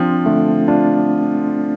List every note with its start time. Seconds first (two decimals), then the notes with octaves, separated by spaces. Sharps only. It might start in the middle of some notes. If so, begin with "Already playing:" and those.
Already playing: F3 C4 D4 F4
0.26 D3 A3
0.68 D4 F4